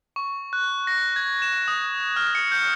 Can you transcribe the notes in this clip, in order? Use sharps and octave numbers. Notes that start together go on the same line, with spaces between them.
C#6
F#6
A#6
G#6
E7
D#6
F6
C#7
G6